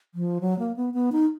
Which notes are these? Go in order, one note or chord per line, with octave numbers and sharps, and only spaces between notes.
F3
F#3
A#3
B3
B3
D#4